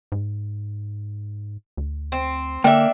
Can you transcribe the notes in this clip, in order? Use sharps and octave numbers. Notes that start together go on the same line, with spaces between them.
G#2
D2
C4
D3 A#3 D4 E5 G5